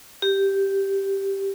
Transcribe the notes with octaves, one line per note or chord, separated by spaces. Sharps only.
G4